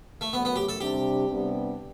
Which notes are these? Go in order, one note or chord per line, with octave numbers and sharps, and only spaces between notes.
A3
F#2 F#3 A3 B3
B3
G4
A4
C3 G3 D4 G4
C3 G3 B3 D4